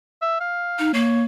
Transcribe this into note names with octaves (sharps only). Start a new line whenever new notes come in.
E5
F5
D#4
A#3 C#5